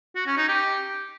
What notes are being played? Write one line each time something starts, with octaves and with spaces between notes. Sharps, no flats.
F#4
C#4
D#4
G4